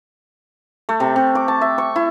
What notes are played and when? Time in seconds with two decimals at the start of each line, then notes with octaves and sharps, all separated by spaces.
0.89 A3
1.00 C3
1.16 C3
1.35 D6
1.48 A5
1.61 E5
1.78 C#6
1.96 E4